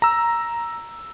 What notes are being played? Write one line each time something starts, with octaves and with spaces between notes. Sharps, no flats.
A#5 E6